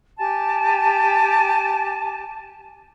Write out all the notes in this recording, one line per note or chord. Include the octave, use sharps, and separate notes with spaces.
G4 G#5 A5